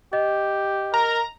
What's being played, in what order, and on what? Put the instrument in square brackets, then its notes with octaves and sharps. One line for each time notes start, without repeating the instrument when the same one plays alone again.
[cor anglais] G4 [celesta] D#5
[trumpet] A#4 [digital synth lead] A#5